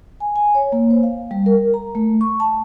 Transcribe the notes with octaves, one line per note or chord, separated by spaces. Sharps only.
G#5
G#5
C#5
A#3
C5
F5
G3
A#4
A#5
A3
C#6
A5